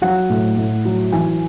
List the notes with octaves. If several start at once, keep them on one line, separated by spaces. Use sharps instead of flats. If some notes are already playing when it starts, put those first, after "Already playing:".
F#3 F#5
A2
A2
F#3
E3 G#5